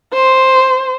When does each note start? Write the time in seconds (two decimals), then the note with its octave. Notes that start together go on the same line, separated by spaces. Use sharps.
0.13 C5